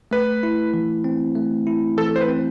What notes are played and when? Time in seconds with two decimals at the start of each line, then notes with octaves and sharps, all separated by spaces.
0.11 A3 B4
0.43 E4
0.74 E3
1.04 C4
1.36 A3
1.67 E4
1.97 E3 A4
2.16 C5
2.21 B4
2.28 C4